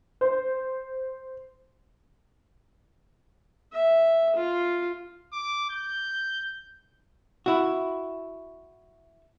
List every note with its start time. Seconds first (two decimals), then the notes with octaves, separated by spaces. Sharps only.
0.21 C5
3.72 E5
4.35 F4
5.33 D6
5.70 G6
7.46 E4 F#4